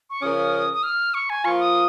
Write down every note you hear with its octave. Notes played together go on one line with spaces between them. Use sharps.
C#6
C#3 F3 C#4 A#4 D#6
D#6
F6
C#6
G#5
F3 A#3 F4 C#6
D#6